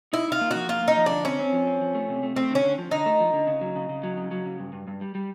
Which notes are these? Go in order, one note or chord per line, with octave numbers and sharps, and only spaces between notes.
D#4 E4
D#4 F4
A#3
F3 F#4
A#3 F4
A#3
D#4
F3
D3 D4
C4 C#4
C4
F3
C4
F3
A3
C3
A3
A3 C4
D3
C#4
D3
F3
D3 D#4
A3
F3
D3
C#3
F#3
C#3
C#3
F#3
C#3
F#3
C#3
G2
G2
G2
G3
G3